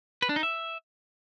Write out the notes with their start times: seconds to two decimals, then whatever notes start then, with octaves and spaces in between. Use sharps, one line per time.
0.22 B4
0.29 D4
0.36 D#4
0.43 E5